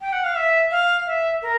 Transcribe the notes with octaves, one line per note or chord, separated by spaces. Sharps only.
G5
F#5
F5
E5
F5
E5
A#4